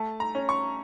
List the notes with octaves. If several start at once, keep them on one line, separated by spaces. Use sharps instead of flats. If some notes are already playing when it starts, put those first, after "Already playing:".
Already playing: A3 A5
A#5
C#4
C#6